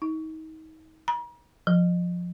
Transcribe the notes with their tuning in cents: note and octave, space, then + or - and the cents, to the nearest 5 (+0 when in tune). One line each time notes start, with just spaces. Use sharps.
D#4 +30
A#5 +40
F3 +15